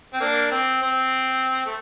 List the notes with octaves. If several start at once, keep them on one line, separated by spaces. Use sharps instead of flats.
C4
A#3 D4
C4
C4
A3